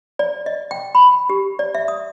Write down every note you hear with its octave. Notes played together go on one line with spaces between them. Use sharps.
D5
D#5
G5
B5
G4
D5
E5
D#6